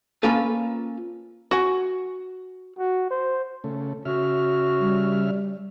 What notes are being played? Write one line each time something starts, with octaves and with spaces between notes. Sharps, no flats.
A#3 C#4 F4 A4 B4
F#4 G#5
F#4
C5
C#3 A3
C#3 F#4 E5 F6
G3